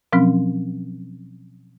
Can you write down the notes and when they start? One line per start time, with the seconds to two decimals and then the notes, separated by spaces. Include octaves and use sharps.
0.12 B2 F3 F#3 C4 C#4